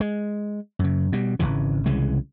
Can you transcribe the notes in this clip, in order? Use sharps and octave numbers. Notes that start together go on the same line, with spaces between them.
G#3
F#2 C#3
B2 G3
G#1 C#2 C#3 E3
C2 C#3 E3 G#3